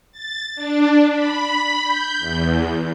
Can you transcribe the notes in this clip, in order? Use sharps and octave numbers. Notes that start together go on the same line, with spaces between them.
A6
D4
B5
G6
E2